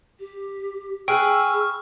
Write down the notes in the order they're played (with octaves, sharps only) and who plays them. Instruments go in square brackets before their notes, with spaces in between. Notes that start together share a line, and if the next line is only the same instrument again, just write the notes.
[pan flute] G4
[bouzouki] G#4 B4 [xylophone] G5 [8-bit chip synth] C#6 F6 [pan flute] E6